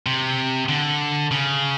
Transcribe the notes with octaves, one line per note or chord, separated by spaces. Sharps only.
C3
D3
C#3